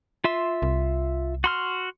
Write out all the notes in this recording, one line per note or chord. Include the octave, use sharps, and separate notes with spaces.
F4 E5 C6
C2
F#4 C6 F6